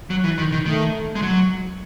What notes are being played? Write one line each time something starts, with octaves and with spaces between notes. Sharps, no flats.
F#3
E3
D#3
D#3
D#3 A3
G#3
F#3